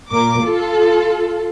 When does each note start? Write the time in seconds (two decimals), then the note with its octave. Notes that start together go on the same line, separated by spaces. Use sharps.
0.10 A#2 A#4 D6
0.43 F4 A4